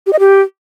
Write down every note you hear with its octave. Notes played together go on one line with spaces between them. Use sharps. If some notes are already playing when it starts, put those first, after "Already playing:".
G4
D#5
G4